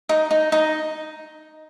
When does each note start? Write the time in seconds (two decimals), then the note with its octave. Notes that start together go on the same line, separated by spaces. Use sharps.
0.09 D#4
0.31 D#4
0.52 D#4